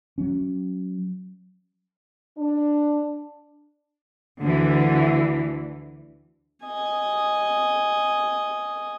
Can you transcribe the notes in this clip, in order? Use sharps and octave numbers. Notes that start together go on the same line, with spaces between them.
F#3 C#4
D4
D2 D3 E3
D#5 G#5